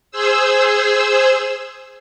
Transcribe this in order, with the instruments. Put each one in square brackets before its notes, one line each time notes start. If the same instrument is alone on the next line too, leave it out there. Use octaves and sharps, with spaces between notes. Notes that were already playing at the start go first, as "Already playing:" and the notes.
[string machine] G#4 C5 E6